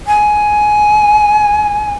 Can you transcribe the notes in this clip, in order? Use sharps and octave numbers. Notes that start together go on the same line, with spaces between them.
G#5